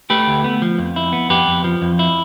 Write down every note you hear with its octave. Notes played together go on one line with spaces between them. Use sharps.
A3 G4 B4
D2
B3
F3
F2
E4
B3
F2 G4 B4
F2
F3
F2
E4